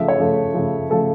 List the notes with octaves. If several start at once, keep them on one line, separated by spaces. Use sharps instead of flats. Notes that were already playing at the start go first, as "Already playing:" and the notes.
Already playing: C#3 F3 A3 E5
C#5
C#3 F3 A3
C#3 F3 A3
C#3 F3 A3 A4